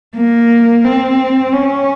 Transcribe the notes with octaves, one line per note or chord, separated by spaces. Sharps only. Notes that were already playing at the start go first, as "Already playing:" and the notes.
A#3
C4
C#4